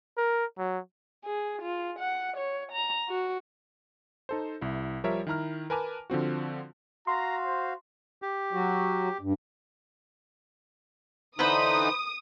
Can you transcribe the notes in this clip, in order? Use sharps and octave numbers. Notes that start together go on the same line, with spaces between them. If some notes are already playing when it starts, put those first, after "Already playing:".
A#4
F#3
G#4
F4
F#5
C#5
A#5
F#4
D#4 A4 C5
C2 E4
F3 G3 A#4 C#5 E5
D#3 E4 A#5 F6
A#4 B4 G#5 A5 D6 F6
D3 F3 C4 F#4
F#4 F5 A#5 C6
C5
G4
F#3 F#4
G2
D3 E3 D#4 B4 C5 B5 D#6